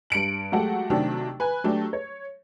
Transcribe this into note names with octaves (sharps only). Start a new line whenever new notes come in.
G2 C#7 D7 F#7
F#3 G#3 A3 G4 A4 F#5
C3 D#3 F#3 A3 D4 G4
B4 G#5
F#3 A3 D4 G4
C#5